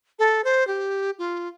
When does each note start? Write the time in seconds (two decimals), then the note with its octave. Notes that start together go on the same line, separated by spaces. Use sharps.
0.19 A4
0.44 C5
0.67 G4
1.19 F4